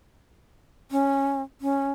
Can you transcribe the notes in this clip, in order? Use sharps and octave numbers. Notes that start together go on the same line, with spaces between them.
C#4
C#4